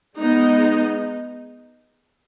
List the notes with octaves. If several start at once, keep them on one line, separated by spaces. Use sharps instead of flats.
G#3 B3 D#4